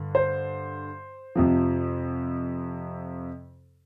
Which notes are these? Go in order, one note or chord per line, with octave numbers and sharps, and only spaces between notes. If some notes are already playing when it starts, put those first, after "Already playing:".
Already playing: G2 D3
C5
F2 C3 F3